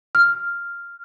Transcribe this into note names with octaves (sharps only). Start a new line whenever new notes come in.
F6